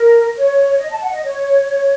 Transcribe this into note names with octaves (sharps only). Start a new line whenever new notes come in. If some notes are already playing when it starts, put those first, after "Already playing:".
Already playing: A#4
C#5
D#5
A5
F#5
D#5
C#5